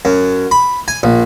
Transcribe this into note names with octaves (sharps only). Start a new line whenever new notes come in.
F#2
B5
G#5
A#1